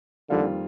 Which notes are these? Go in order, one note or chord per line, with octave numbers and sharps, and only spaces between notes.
F2 D3 D#3 G3 A#3 F4